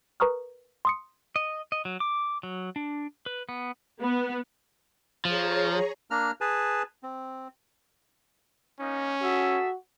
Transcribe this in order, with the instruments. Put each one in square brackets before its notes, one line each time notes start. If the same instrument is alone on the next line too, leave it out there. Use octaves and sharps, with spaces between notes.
[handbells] A#4 B4 A#5 C#6 D#6 F6
C6 D#6 C#7
[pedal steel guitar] D#5
D#5
F#3
D6
F#3
D4
B4
B3
[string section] B3
[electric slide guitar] F3 [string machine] G#4 C#5 A#5
[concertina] A#3 D4 A#5 F6
G#4 B4 G#5 A5
C4
[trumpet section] A#3 D#4 [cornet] C#4
[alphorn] F#4 [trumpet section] G#4 A4 E5